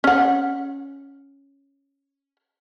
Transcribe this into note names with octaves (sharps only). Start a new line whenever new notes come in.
C#4 F#5